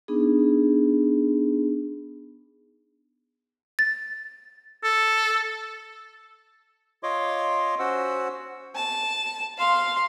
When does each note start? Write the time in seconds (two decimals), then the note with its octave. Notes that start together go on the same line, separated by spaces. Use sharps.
0.08 B3 D4 D#4 G#4
3.79 A6
4.83 A4
7.03 F4 C#5 D#5 C6 D6
7.79 C#4 F#4 C5 F#5 E6
8.75 A5
9.58 F5 C6